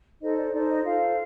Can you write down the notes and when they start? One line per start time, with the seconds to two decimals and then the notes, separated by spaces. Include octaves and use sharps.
0.20 D#4 A4 C5 D#5
0.37 D5
0.52 D#4 A4 C5 D5
0.68 D#5
0.84 F4 A4 C5 F5